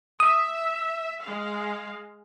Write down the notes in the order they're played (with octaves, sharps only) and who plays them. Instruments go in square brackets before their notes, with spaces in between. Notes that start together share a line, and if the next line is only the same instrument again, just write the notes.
[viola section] E5 [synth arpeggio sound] D#6
[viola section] G#3 F5